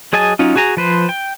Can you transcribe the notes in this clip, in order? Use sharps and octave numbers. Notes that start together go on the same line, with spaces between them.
F#3 G#4 D#5 G#5 A5
F#3 C#4 D#4 F4
F#4 G#4 G#5 A#5
F3 B4 C5
G5